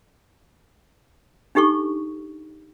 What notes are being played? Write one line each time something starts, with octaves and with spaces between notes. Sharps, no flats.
D4 D#4 G4 A4 C#6